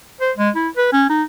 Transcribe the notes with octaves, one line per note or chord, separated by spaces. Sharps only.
C5
G#3
E4
B4
C#4
D#4